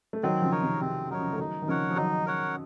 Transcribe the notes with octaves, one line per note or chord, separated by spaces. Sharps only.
A3
D#3 F#3 C4
C#3 F3
D#4 A#4 C#5
C3 D#3
C3 C4
F#3 D#4 A#4 C#5
C#3 F3
A3
D#3 F#3 D#4
D#3
C#3 F3 A#4 C#5 F#5
F3
D#3 F#3 D#4
A#4 C#5 F#5